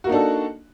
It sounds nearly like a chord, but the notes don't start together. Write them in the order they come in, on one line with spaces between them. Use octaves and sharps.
F#4 A#3 D#4 D4 A4